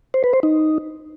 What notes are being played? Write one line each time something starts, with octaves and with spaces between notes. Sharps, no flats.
C5
B4
C5
D#4